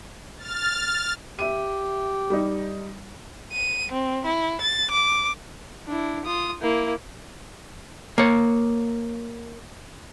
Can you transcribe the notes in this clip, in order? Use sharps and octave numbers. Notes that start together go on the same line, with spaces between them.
F6 A6
G4 E5 D#7
G3 D#4
D#7
C4
E4
A6
D6
D4 E4
F4 D#6
A#3 E4
A#3 C#5